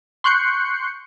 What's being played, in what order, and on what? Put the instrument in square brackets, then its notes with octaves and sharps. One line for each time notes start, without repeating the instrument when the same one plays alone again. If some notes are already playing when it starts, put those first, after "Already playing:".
[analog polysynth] C6 C#6 F#6 G6 C7 C#7